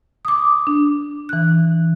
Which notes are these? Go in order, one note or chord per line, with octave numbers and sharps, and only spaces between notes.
D6 D#6
D4
E3 F#6